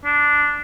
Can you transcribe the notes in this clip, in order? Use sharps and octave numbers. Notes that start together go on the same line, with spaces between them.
D4